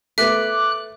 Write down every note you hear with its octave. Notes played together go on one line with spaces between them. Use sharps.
A3 B3 E5 D6 F#6